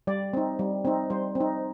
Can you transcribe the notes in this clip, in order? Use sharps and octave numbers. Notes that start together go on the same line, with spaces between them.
G3 D5
C4 D#4
G3
C4 D#4
G3 C5
C4
D#4